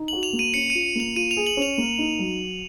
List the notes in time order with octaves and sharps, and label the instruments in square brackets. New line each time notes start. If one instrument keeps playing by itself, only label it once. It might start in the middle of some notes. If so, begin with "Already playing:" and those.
Already playing: [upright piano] D#4
[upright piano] F#4 [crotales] F#7
[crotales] F7
[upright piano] A#3
[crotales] D#7
[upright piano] C#4 [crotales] C#7
[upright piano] F4 [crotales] D#7
[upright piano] A#3 [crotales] F7
[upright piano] F4 [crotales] D#7
[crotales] F7
[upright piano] G#4
[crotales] F#7
[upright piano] C#4
[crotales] F7
[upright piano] A#3
D#4
F#3